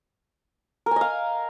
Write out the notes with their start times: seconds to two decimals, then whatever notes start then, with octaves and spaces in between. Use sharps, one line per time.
0.86 A#4
0.91 G#5
0.96 D#5
1.01 F5